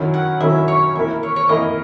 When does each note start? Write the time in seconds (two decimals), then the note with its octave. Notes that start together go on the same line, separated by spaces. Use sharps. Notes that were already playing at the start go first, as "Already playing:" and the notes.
Already playing: D#3 F#3 C#4 E4 A#4
0.14 F#5
0.41 D#3 F#3 C#4 E4 A#4 E5
0.68 C#5
0.95 E3 A#3 E4 A#4 E5
1.23 C#5
1.36 C#5
1.49 E3 A#3 E4 A#4 D#5